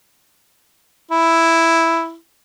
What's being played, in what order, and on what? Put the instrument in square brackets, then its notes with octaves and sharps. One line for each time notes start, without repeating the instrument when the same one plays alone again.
[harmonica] E4